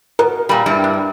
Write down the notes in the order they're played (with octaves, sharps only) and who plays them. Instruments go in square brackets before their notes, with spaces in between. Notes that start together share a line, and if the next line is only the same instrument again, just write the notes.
[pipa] B2 [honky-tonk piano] A#4
[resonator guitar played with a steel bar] A#2 G3 [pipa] B5
[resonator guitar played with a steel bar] G2 G3 E4
[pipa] D4